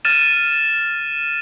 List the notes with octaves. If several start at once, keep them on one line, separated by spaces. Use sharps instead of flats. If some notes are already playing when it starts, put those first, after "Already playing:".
F6 A6 D#7 E7